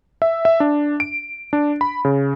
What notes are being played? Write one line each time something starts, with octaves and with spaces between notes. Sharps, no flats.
E5
E5
D4
D7
D4
B5
C#3